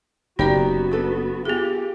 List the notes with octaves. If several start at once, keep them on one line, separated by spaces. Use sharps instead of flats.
F#1 B3 D#4 F#4 G4 D5 A#5
D4 A4 B4
B3 F4 G4 G#4